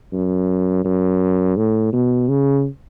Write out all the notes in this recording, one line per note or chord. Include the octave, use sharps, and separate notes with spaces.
F#2
F#2
A2
B2
C#3